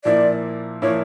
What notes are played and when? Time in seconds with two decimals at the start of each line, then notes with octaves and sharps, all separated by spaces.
0.05 A#2 F3 A#3 E4 D5
0.82 A#2 F3 A#3 E4 C#5